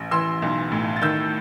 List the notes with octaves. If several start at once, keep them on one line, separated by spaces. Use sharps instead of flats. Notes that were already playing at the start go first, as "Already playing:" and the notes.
Already playing: A1
E3 C6 E6
B1
A2
A6
D#3 E6 G6